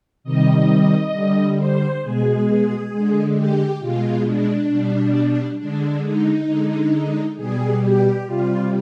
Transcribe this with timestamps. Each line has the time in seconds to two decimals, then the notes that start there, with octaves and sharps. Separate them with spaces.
0.24 C3 D#3 G3 D#5
1.13 D3 G3
1.58 C5
2.02 B2 G#3 G#4
2.92 D3 G#3
3.36 G4
3.80 B2 G#3 F4
4.25 D4
4.69 B2 G3
5.58 D3 G#3 D4
6.03 D#4
6.48 D3 G#3
7.37 B2 G3 G#4
7.82 G4
8.26 C3 G3 F4